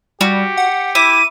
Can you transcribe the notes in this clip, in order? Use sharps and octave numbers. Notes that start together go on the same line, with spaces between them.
G3 F#4 G4
F#5
E4 D6 D#7